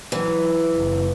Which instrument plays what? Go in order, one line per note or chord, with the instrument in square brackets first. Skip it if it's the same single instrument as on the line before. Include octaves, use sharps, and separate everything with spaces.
[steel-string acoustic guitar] E3 [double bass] F#3
[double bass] F#1